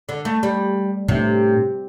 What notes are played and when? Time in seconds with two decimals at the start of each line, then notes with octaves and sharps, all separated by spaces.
0.09 D3
0.25 A3
0.43 G3
1.08 A2 C3 A3 D4